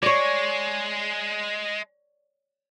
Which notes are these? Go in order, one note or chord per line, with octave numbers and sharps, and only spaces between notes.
G#3 C#5 D5